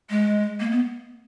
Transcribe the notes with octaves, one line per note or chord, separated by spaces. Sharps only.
G#3
A#3
B3